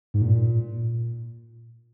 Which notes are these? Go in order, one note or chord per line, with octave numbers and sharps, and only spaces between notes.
G#2
A#2